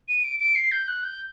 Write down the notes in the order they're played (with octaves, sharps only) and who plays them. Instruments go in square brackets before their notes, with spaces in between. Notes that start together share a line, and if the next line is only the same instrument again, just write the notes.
[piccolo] D#7
D7
D7
C7
G6
F#6
G6